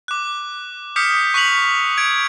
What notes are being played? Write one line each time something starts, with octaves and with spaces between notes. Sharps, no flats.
D6 F#6
D6 D#6 F6 G6 B6 C#7
C#6 F#6 B6 C#7 F7 F#7
G#6 D7